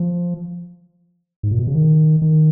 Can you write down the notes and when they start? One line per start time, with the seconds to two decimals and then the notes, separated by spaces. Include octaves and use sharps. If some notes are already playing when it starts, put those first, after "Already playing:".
Already playing: F3
1.43 G#2
1.51 A#2
1.59 B2
1.67 C#3
1.75 D#3
2.22 D#3